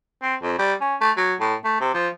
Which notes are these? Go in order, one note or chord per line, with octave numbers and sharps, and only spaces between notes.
C4
F2
G3
C#4
A3
F#3
A2
A3
C3
F3